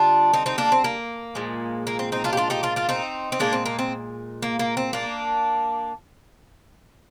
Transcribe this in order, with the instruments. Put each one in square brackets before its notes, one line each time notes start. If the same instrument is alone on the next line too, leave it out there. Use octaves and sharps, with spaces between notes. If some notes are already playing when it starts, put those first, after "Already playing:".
Already playing: [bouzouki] D3 G3 D4 F4
C4 D#4
C4 D#4
A#3 D4
C4
A#3
A#2 F3 G#3
A#3
C4
C4 D#4
D4 F4
G4
D4 F4
D#4 G4
D4 F4
D4 F4
C4 D#4
C4
A#2 F3 G#3 A#3 D4
C4
A#3
C4
A#3
A#3
C4
A#3 D4